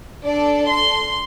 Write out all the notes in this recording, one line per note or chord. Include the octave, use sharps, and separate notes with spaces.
D4 A4 D5
C6